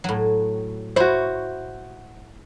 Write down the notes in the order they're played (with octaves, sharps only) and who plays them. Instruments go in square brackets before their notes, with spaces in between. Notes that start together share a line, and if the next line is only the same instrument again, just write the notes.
[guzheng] A2 F#3
[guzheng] E4 C#5 [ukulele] F#4 C5